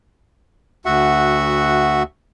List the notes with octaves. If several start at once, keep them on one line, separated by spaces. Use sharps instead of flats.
D2 F#4 E5 F#5